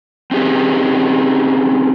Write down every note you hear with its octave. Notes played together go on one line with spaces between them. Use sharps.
C4 C#4 D#4 G4 G#4 B4